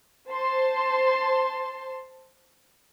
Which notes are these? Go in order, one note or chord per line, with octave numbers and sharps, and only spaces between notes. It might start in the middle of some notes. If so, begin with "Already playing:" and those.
C5 A5 C6